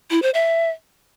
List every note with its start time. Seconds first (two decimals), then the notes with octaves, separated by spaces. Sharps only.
0.11 E4
0.22 C5
0.34 E5